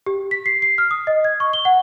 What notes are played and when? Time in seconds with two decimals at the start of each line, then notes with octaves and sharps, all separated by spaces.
0.06 G4
0.31 B6
0.46 C7
0.62 C7
0.78 F6
0.91 D#6
1.07 D#5
1.25 G#6
1.40 C#6
1.53 G7
1.65 F#5